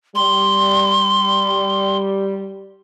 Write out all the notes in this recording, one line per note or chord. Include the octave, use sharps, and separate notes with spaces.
G3 C6